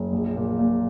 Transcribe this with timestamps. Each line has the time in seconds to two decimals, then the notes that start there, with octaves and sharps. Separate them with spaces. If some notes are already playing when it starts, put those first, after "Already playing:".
Already playing: F#1
0.12 A#1
0.36 A#2
0.59 A#2